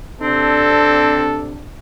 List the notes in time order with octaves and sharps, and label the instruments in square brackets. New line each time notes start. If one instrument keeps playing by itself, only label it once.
[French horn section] C3 D4 [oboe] C4 [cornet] A4